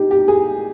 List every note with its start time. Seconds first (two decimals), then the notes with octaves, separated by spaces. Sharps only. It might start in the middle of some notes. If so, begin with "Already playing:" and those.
Already playing: D#4 G4
0.11 G4
0.28 G#4